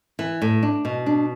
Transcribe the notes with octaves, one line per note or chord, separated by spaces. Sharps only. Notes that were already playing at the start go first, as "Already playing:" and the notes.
E3
A2
D4
B2
D4